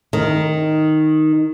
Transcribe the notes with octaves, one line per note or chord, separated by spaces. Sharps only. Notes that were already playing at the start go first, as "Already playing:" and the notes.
D#3